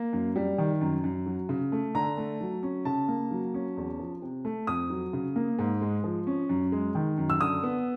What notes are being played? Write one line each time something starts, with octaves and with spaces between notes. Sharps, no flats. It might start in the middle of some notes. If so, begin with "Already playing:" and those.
Already playing: A#3
F#2
G3
D#3
F#2
F#2
F#3
C#3
A3
D3 A#5
A3
F#3
C#4
C#3 A5
A#3
F#3
C#4
E2
F3
C3
A3
F2 D#6
F#3
C#3
A#3
G#2
G#3
F3
C#4
F#2
G#3
D#3
F#2
E6
D3 D#6
B3